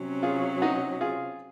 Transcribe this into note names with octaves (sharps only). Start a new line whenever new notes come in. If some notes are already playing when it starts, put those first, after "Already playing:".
Already playing: C3 F#3 C#4
F4 G#4
D#4 F#4
F4 G#4